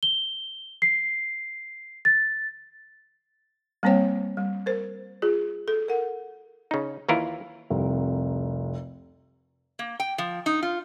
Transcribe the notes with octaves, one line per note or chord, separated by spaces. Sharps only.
G7
C7
A6
G3 A#3 C4 C5 C#5 G5
G3
A#4 C5
F4 G#4
A4
A#4 F#5
C#3 D#4
D#2 E3 E4 F4 A#4
F1 C2
A#3
G5
F3
D#4
F4